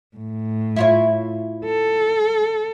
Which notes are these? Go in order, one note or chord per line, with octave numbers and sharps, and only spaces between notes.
A2
E4 F4 C#5
A4